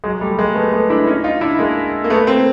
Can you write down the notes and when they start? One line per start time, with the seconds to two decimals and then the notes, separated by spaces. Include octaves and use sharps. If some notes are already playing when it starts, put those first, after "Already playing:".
0.04 F#3 G#3
0.21 G3 A3
0.39 G#3 A#3
0.55 A3 B3
0.73 A3 B3
0.90 D4 E4
1.07 C#4 D#4
1.24 D#4 F4
1.41 D4 E4
1.59 G#3 A#3
2.04 A#3
2.10 A3 B3
2.27 A#3 C4